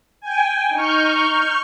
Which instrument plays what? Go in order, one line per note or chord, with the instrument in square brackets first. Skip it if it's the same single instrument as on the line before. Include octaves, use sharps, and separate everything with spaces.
[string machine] G5 G#5
[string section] D#4 [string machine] C#6 F6 G6